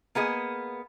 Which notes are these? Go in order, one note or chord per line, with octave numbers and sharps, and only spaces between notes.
A#3 B3 G#4 D#5